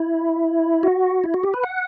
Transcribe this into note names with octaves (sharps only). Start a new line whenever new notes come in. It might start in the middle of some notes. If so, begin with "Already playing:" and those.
Already playing: E4
F#4
E4
F#4
G4
B4
F#5